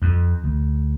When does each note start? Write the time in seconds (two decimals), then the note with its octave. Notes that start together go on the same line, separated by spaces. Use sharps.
0.02 F2
0.44 D2